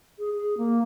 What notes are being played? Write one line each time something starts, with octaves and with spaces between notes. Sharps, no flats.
G#4
G#4
A#3